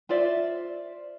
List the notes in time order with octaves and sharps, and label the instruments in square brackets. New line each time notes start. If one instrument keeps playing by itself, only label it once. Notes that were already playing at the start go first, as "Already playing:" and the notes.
[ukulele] F4 C5 D5 E5